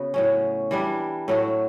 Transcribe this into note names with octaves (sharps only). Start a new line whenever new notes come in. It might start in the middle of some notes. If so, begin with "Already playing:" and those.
Already playing: C#3 B3 F#4
A2 F#3 C#4
E3 G3 D4
A2 F#3 A3